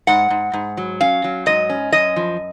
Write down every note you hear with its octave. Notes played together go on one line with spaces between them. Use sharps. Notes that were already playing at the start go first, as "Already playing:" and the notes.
G#2 F#5
G#2
G#2
F#3
C#4 F5
F#3
G#2 D#5
C#4
F#2 D#5
F3